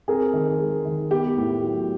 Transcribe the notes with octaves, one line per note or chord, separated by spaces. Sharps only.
C4 G#4 A#4
D#3
G#3
D#3
B3 G4
A2
F#3